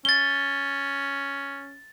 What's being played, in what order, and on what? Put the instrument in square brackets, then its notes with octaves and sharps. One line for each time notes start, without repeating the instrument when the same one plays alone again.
[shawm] C#4 [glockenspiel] A6 G7